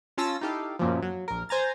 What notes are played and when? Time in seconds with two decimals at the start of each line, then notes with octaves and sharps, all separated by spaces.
0.18 C#4 F4 A5 E6 A#6
0.41 D#4 E4 G4 A4 F5
0.79 F#2 A#2 F3
1.02 F#3
1.28 A#1 A#4
1.49 C5 G#5 A#5 A6